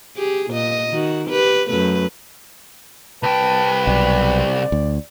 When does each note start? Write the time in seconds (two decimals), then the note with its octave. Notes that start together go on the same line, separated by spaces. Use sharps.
0.16 G4 G#4
0.51 A#2 D#5
0.90 D#3 F#4
1.28 G4 B4
1.69 F#2 A3 B4
3.23 C2 B4 G5 A5
3.87 B1 D5
4.72 D2